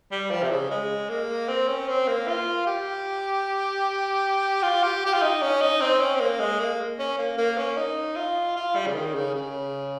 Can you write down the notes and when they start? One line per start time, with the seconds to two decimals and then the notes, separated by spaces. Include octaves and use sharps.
0.12 G3
0.31 F3
0.43 C3
0.51 C#3
0.70 G#3
1.09 A#3
1.48 C4
1.68 C#4
1.88 C4
2.08 A#3
2.28 F4
2.66 G4
4.63 F4
4.83 G4
5.06 G4
5.13 F4
5.22 D#4
5.42 C#4
5.61 D#4
5.81 C4
6.01 C#4
6.16 C4
6.20 A#3
6.40 G#3
6.60 A#3
6.99 C#4
7.18 A#3
7.38 A#3
7.58 C#4
7.77 D#4
8.17 F4
8.56 F4
8.75 G3
8.87 C#3
8.95 D#3
9.15 C#3
9.35 C#3